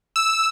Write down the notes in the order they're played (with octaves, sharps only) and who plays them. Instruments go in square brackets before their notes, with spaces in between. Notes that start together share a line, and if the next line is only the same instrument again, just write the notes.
[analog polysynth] E6